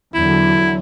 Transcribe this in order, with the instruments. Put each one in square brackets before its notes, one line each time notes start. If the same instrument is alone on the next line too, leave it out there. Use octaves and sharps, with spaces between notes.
[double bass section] E2 D3 [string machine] F#3 [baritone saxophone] E4